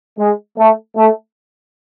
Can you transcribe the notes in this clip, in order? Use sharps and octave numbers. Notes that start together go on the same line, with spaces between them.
G#3
A3
A3